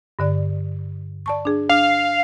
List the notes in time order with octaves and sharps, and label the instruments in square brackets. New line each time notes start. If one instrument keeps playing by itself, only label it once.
[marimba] G2 D3 D5
D5 A5 C#6
D4 G#4
[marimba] D4 [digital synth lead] F5